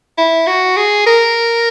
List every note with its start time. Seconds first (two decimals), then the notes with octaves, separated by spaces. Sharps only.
0.18 E4
0.47 F#4
0.77 G#4
1.07 A#4